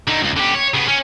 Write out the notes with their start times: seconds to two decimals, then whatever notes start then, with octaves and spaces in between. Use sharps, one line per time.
0.08 D3 D#4
0.21 C#2 F#2
0.37 D3 G4
0.55 C#5
0.74 C#3 B3
0.88 C#4